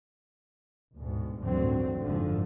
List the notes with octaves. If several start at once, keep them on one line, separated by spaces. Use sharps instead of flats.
D2 G#2 B2
A1 D2 G2 D3 F#3 C4
F#1 E2 G#2 D3 F3